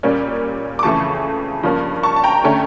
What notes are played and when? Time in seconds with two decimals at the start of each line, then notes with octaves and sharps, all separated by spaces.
0.03 A#2 G3 A#3 C#4
0.79 D6
0.83 F2 C#3 E3 A3 A5 C#6
1.63 G2 F3 A#3 C#4
2.03 A5 C#6
2.16 A5
2.24 G5 A#5
2.44 D3 A3 C#4